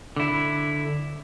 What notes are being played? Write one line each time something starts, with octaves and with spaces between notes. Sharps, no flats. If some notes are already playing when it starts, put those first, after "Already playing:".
D3 E4